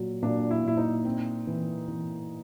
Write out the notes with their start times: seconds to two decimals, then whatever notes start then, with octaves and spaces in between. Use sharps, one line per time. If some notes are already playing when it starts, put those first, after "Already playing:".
Already playing: A#2 F#3
0.23 A#2 D4
0.51 E4
0.64 A#2 E4
0.77 D#4
1.05 C4
1.47 E3
1.88 E3